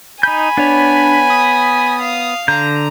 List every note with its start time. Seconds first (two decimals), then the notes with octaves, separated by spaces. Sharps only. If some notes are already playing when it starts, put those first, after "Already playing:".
0.23 D#4 G#5 B5 G6
0.57 B3 D4 C#5
1.30 D#6
2.02 F5
2.48 D3 A#5 G6